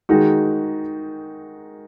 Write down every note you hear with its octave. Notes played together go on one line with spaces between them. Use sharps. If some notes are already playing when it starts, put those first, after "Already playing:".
D#3 G#3 D#4 F#4